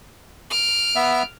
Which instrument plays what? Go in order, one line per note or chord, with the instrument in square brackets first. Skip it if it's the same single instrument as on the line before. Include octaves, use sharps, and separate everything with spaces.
[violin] F6 D7
[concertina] B3 E5